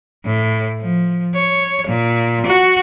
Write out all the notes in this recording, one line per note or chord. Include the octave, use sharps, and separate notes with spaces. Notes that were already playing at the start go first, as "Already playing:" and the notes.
A2
F3
C#5
A#2
F#4